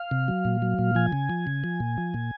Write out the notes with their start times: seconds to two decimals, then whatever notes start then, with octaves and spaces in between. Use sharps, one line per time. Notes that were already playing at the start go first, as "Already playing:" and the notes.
Already playing: F5
0.11 C3
0.28 F#3
0.45 A#2
0.62 F#3
0.79 A#2
0.95 F3 G#5
1.13 C#3
1.30 F3
1.47 C#3
1.64 F3
1.80 A#2
1.98 F3
2.14 A#2